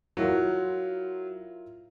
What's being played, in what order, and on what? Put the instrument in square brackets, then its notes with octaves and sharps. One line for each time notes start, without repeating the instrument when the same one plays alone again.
[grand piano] F#3 [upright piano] E4 F4 A#4